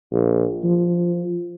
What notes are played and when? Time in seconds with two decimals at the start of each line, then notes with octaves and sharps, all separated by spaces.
0.12 A#1
0.64 F3